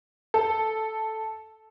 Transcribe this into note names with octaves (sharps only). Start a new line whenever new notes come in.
A4